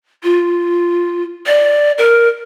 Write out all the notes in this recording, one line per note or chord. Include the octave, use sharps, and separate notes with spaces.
F4
D5
A#4